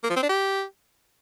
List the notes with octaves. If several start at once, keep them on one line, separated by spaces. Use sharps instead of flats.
A#3
F3
C4
D4
G4